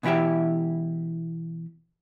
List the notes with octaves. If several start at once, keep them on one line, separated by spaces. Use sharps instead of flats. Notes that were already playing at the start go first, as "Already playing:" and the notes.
B2 E3 E4 G4 E5